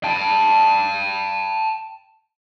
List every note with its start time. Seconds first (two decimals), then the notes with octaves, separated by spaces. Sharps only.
0.04 G5 A5